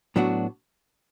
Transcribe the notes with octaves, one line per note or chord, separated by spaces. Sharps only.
A2 F#3 B3 D4 F#4